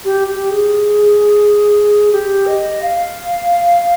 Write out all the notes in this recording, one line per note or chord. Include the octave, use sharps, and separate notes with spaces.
G4
G4
G#4
G4
D#5
F5